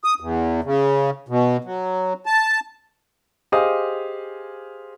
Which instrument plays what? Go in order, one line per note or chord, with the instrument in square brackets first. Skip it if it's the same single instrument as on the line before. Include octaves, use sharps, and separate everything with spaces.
[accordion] D#6
E2
C#3
B2
F#3
A5
[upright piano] G4 G#4 C5 D#5 F5 D#6